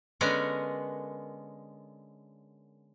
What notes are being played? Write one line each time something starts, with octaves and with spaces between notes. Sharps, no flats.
D3 G#3 B3 C#4 A#4